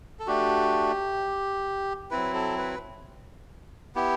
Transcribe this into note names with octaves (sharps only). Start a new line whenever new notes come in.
A4
A3 D4 F#4 G4
F#3 C4 E4 B4
A4
B4
B3 E4 G4